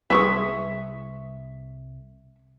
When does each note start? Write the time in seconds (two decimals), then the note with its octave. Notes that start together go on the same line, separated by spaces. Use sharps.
0.10 C2 G#3 E4 B4 E5 C#6 D#6